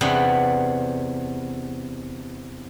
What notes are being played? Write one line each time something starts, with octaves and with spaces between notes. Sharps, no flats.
E2 C3 B3 D4 D5